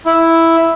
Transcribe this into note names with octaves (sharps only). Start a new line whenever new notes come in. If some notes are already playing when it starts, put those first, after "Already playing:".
E4